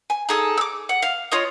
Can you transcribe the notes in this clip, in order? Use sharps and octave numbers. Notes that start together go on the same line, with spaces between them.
G#5
D#4 G#4 A4
D6 E6
F#5
F5
F4 C#5 D#5